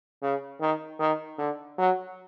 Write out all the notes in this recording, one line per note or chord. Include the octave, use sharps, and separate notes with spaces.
C#3
D#3
D#3
D3
F#3